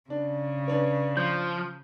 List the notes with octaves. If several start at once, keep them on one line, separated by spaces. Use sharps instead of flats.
C#3 D4
D4 B4 C#5
F3 G6